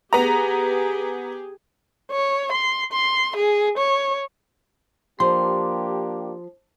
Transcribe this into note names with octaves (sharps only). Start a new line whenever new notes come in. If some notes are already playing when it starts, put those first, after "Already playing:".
B3 G4 G#4 A#5
C#5
C6
C6
G#4
C#5
F3 A#3 D4 G4 C6